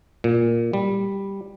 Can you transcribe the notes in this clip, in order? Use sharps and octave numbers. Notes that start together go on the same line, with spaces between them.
A#2
G3